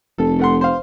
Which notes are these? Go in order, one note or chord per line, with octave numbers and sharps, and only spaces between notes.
F1 A4
A3 F#5 C6
C5 F5